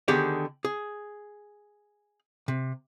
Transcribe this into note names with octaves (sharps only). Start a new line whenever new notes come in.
D3 D#3 B3 G4 G#4 D5
G#4
C3